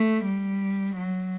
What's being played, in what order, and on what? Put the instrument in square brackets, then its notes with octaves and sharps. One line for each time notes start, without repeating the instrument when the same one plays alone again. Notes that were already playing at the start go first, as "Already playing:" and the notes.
Already playing: [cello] A3
G3
F#3